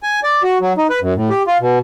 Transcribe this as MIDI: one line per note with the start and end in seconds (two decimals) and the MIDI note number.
0.03 0.20 80
0.23 0.42 74
0.43 0.58 66
0.61 0.73 54
0.78 0.87 63
0.90 1.00 71
1.02 1.14 42
1.15 1.29 45
1.30 1.43 67
1.47 1.58 65
1.60 1.79 47